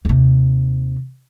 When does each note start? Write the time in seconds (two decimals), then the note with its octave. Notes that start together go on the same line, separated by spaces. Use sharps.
0.05 D#2 C3